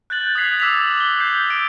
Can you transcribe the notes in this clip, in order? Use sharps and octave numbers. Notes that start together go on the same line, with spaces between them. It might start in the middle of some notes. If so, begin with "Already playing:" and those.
F#6 G6 A6 F#7
D#6 F#6 G#6 B6 C7 F7
D6 E6 B6 C7 F7
G7
G6 C7
E6 D7